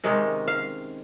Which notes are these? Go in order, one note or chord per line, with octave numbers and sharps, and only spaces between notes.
C3 D#3 G#3 C#4
F5